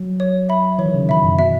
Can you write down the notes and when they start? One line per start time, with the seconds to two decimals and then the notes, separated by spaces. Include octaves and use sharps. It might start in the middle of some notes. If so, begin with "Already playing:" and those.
Already playing: F#3
0.20 C#5
0.49 E5 B5
0.79 E3 C#5
0.86 D#3
0.94 C#3
1.09 B2 E5 B5
1.24 F#2
1.39 B2 E5